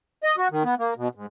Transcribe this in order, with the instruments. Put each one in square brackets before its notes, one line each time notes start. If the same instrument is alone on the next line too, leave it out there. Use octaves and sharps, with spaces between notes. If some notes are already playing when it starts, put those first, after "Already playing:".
[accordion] D#5
F#4
D#3
B3
A#3
B2
G#2